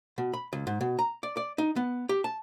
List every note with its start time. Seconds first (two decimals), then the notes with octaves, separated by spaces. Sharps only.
0.18 B2
0.33 B5
0.53 C#2
0.67 G#2
0.81 B2
0.99 A#5
1.23 D5
1.37 D5
1.58 D#4
1.76 B3
2.09 G4
2.24 A5